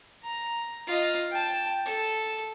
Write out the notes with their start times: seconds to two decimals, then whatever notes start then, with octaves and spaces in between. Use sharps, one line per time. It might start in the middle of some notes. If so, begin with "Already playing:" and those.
0.23 A#5
0.87 F4 D#5
1.31 G5 A5
1.86 A4